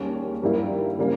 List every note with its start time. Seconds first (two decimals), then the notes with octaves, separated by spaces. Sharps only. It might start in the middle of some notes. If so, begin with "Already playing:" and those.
Already playing: D#2 D#3 G3 C#4 G#4
0.42 G2 D#3 G3 A#3 E4
0.99 C#3 G3 A#3